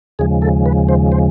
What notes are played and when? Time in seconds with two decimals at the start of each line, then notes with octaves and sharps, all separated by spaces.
0.19 D#2 C#3 F3 G#3 G#4
0.42 A4
0.66 B4
0.89 C5
1.12 C5